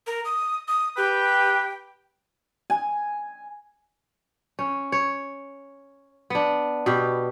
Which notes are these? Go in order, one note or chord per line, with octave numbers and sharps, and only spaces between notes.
A#4
D#6
D#6
G4 B4 G5
G#5
C#4
C#5
B3 D4
B2 G4